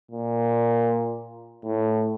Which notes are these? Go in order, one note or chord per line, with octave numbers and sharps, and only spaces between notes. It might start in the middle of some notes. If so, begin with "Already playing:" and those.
A#2
A2